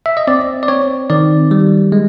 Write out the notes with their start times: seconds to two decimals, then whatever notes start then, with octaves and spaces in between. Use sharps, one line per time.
0.06 E5
0.17 D#5
0.27 C4 D5
0.63 D5
0.68 C4 C#5
1.10 D#3 D5
1.51 G3
1.92 G#3